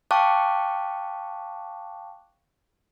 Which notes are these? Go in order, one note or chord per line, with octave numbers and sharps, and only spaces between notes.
F5 G5 A5 C#6 D6 F#6